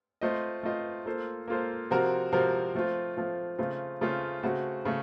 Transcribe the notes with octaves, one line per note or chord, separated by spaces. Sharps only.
A3 C4 F4 C5 D#5
A3 C4 F4 C5 D#5
A#3 F4 A4 C5
A#3 F4 A4 C5
C3 F3 C4 F#4 A#4
C3 F3 C4 F#4 A#4
F3 A3 C4 F4
F3 A3 C4 F4
C#3 A3 C4 F4
C#3 A3 C4 F4
C#3 A3 C4 F#4
C#3 A3